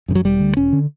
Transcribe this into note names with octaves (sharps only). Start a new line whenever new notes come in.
F#2 C#3
F#3
E1 G3
D2 D3
E1 C#4
D3